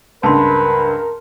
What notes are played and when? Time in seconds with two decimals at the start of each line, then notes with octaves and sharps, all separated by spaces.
0.23 C#2 G2 A#4 B4 A5 C6